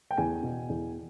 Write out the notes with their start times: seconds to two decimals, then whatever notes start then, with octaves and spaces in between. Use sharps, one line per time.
0.11 G5
0.17 E2 G#5
0.43 B2
0.69 E2